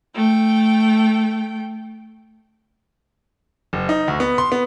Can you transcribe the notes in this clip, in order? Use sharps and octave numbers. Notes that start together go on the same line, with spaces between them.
A3 G5
F#1
D#4
D2
B3
C6
B3